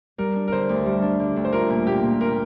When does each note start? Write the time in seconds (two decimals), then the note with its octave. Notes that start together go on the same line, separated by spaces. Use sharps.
0.18 G3 A#4
0.35 D4
0.48 A#4
0.52 D3 C5
0.69 D2
0.86 G3
1.02 D4
1.20 D3
1.36 D2
1.45 C5
1.53 F4 A#4
1.70 A#2
1.87 A#3 G4
2.03 A#2
2.21 F4 A#4